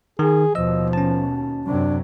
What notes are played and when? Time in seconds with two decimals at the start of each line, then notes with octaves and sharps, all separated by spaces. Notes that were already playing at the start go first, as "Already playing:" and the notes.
0.19 D#3 G#4
0.55 D#2 B2 F3 D#5 E6
0.93 C#4 A5
1.66 F#2 C3 F#3 D4